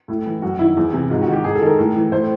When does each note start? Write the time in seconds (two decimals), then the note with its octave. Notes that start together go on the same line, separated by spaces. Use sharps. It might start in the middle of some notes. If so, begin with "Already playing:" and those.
0.08 A2 E4
0.26 E3
0.42 F#2 F#4
0.59 D#3 E4
0.77 E2
0.93 C3 E3
1.10 G#2 F4
1.22 F#4
1.28 D#3 G4
1.44 G#2 G#4
1.55 A4
1.61 D#3
1.66 A#4
1.78 A2
1.95 E3
2.12 A2 C5